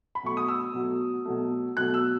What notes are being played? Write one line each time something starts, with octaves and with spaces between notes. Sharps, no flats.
B5
B2 F#3 A3 C#6
D#6
E6
B2 F#3 A3
B2 F#3 A3
B2 F#3 A3 F#6
E6